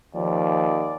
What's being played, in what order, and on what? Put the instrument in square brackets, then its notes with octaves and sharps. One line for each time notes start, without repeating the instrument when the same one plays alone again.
[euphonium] D#2 [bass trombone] F3 [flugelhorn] D5